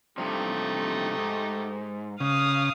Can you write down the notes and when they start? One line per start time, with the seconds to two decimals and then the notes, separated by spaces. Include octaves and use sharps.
0.18 G2 C3 F3 A3 D#4 G4
1.17 G#2
2.20 C#3 F5 D#6